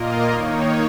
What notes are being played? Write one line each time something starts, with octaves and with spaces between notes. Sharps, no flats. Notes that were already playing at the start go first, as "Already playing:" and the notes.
Already playing: A#2 A#3 F4 A#4 D#5
D#3 A#3 D#4 C#5